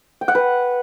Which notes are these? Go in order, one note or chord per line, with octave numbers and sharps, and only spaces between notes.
G5
F#5
B4